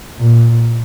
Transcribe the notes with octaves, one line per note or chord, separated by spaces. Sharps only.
A#2